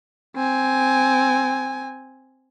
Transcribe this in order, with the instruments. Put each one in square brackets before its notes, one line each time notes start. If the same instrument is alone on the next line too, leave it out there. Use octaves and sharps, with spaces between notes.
[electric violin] C4 G#5